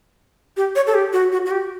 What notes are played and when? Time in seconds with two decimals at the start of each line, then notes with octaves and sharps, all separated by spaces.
0.57 G4
0.76 C#5
0.87 A4
0.94 G4
1.13 F#4
1.32 F#4
1.46 F#4
1.51 G4